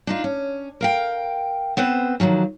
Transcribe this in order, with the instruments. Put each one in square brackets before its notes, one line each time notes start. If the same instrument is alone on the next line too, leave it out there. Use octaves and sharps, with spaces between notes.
[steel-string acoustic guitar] D4 D#4 F4
C#4
A#4 F5 G5
B3 C4 B4 C5
D3 D#3 F3 F#3 C#4